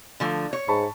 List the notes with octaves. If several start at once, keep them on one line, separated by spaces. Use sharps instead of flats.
D3 F3 A3
C#5
G#2 A5 B5 C#6